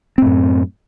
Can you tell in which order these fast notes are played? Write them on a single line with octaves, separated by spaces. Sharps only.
C4 A2 F#2